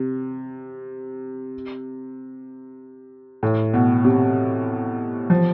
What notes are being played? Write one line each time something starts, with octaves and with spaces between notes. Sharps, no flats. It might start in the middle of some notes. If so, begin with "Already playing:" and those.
Already playing: C3
A2
B2
C3
F3